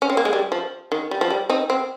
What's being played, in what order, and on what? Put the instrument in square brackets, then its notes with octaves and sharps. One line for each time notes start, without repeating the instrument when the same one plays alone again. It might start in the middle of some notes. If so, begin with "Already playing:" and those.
[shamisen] C#4
C4
A#3
G#3
G3
F3
D#3
G3
F3
G3
C4 D#4
C4